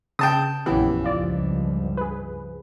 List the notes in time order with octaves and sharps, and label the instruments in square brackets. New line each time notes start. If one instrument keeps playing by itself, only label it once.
[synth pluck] C#3 [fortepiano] G5 A5 D#6
[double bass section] A#1 F#2 C#4 [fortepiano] E3 [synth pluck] B3 G4
[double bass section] C#2 G2 F3 [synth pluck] F4 D5
[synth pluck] G#4 B4